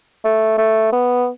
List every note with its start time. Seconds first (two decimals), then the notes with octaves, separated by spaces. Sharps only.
0.24 A3
0.58 A3
0.92 B3